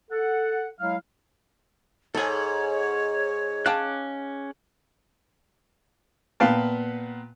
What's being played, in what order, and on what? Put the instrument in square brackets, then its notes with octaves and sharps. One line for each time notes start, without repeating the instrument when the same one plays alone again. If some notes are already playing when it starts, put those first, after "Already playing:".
[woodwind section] A4 F#5
F#3 G#3 E4 F5
[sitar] G#2 [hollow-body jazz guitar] A4 G#5 [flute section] C#5
[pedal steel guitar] C#4 D6 F#6 [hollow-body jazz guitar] F5 G5 A5
[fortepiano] A#2 B3 B4 F5 G5 A5